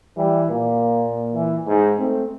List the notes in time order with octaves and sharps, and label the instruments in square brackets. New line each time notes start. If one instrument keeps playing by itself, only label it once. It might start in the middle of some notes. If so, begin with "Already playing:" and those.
[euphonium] E3 [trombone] G3
[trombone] A#2 [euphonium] A#3
[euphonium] E3
G#2
[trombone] A3 [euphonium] C4